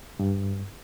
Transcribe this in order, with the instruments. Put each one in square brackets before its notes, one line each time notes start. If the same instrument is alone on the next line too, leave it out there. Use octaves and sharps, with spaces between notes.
[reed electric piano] G2